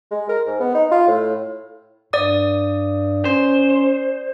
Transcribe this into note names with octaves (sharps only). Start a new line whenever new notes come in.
G#3
A#4
G#2
B3
D#4
F4
A2
G2 D5 D#6
C#4 C5